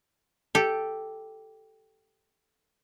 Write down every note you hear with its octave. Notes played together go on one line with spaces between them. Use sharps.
G4 A4